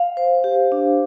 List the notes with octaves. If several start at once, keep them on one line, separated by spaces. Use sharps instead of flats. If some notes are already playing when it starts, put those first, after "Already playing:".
Already playing: F5
C5
G4
D4